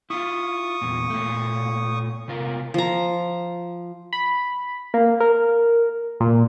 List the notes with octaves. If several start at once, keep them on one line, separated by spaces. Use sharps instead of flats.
E4 F4 C#6 D#6
E2 A#2
A#2 A3
C3 F4 A#4
F3 A#5
B5
A#3
A#4
A#2